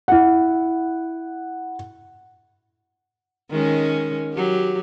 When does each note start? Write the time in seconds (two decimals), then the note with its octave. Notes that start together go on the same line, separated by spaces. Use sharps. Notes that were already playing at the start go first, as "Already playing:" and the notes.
0.08 E4 F#5
3.51 D#3 G#3 C#4
4.33 F#3 G4